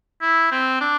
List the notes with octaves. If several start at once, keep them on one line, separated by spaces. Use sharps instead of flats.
E4
C4
D4